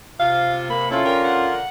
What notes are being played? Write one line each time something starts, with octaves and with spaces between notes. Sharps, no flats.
C3 F4 F5
A#3 B5
C#4 E4 F4 A4
D3 A#4 G5
F#5